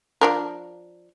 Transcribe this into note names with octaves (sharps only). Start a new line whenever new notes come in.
F3 D4 A#4